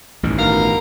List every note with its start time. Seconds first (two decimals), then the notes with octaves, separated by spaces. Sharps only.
0.23 A1 G2 D#3
0.37 B2 A#4 F5